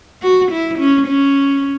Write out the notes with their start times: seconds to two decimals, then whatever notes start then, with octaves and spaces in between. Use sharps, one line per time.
0.22 F#4
0.51 E4
0.79 C#4
1.07 C#4